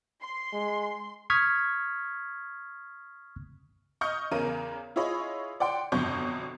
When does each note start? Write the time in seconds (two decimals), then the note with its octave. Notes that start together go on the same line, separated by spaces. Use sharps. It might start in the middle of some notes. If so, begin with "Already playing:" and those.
0.22 C6
0.53 G#3
1.30 C#6 D#6 F6 G#6 B6
4.01 D#5 C#6 D#6 F6 G6 C#7
4.31 E2 C#3 C#4 A#4 D#7
4.96 E4 F4 G#4 C#5 D#5 B5
5.60 D5 F#5 G5 C6
5.92 G1 F2 B2 F#3 C#6 G6